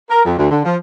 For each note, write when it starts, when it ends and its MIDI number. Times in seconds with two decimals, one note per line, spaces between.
0.10 0.20 70
0.24 0.33 41
0.37 0.47 38
0.50 0.60 50
0.64 0.75 53